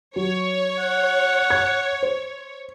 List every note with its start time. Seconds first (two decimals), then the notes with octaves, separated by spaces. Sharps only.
0.16 F#3 C#5
0.79 F#5
1.50 G#6
2.03 C5